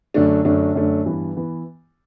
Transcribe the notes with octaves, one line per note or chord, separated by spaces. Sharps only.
F#2 D3 A3 D4
F#2 D3 A3 D4
F#2 D3 A3 D4
G2 E3 B3
E3 B3